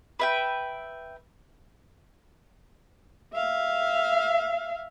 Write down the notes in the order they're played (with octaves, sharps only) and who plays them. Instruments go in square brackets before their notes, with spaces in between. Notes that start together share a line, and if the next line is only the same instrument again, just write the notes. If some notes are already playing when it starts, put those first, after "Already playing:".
[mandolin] B4 E5 G5
[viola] E5 F5